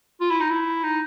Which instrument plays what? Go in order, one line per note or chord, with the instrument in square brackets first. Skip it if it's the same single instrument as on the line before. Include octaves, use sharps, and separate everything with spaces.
[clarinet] F4
E4
D#4
E4
D#4